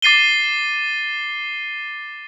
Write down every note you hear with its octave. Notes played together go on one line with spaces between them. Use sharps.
D6 A6 C7 D#7 G7